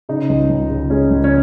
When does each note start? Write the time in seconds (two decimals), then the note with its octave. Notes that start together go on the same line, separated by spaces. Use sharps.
0.09 C#3 D#4
0.29 C#2
0.49 C#2
0.70 C#3
0.90 G#3 C#4
1.10 C#2
1.24 C#4